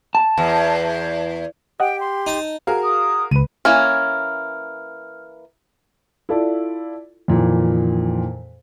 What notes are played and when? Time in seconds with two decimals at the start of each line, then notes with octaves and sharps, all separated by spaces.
0.15 A5
0.38 E2
1.80 G4 D#5 F#5 G5
2.00 C6
2.26 D#4 A5
2.67 F#4 G#4 A#4 F5
2.83 D#6
3.31 C#2 B4 D#7
3.65 E3 A#3 C#4 F6
6.29 E4 F4 A4 D5
7.28 F2 A#2 D#3 E3